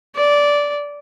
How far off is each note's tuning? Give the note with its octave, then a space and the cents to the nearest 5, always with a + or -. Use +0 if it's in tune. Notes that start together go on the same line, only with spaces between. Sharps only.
D5 -10